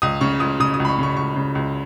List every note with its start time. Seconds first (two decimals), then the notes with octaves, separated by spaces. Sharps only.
0.02 C#2 D#6
0.21 C#3 C#6
0.40 C#2 D#6
0.60 C#3 D#6
0.74 D#6
0.80 C#2
0.85 B5
0.88 C#6
0.99 C#3 C#6
1.10 B5
1.17 C#2 C#6
1.36 C#3
1.55 C#2